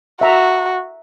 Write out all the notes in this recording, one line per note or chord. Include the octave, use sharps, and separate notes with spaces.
F#4 E5 A#5